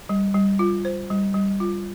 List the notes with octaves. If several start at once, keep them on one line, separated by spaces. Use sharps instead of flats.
G3
G3
F4
C5
G3
G3
F4